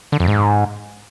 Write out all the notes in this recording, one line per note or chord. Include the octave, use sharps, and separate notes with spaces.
D3
F2
G#2